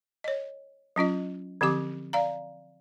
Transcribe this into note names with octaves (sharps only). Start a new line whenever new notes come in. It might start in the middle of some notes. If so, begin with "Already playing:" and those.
C#5 D#5
F#3 C#4 F4 D#5
D3 F3 C4 G4 D6
D5 F5 A#5